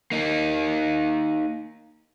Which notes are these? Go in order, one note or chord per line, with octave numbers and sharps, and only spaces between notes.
A#3 D#4